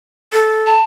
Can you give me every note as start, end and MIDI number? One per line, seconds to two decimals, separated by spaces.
0.33 0.72 69
0.67 0.82 81